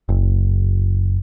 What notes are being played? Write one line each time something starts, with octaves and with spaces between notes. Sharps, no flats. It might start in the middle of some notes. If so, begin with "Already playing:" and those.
F#1